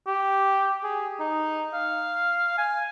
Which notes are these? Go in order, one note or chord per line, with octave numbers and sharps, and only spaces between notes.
G4
G#4
D#4
F5
G#5